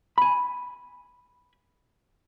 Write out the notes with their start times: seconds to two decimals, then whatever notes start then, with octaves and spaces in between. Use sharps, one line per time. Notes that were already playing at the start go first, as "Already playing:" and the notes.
0.18 G#5 B5